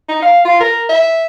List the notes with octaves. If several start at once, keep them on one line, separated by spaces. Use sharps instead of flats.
D#4
F5
F4
A#4
E5